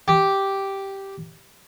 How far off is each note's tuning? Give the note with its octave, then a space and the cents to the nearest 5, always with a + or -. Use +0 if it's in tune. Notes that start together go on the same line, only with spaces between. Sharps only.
G4 -5